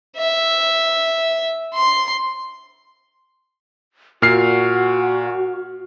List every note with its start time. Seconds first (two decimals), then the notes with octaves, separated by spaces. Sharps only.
0.18 E5
1.75 C6
4.22 A#2 F#4 F6 C7